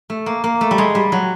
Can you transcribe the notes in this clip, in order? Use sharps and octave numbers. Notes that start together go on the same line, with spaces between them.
A3
A#3
A#3
A3
G3
G#3
G3
F#3